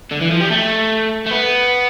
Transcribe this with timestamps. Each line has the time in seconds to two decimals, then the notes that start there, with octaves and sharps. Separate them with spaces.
0.11 D3
0.21 E3
0.31 F3
0.40 G3
0.51 A3
1.26 A3
1.31 B3